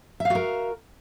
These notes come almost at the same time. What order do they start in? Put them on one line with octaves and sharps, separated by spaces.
E5 F5 F#4 A#4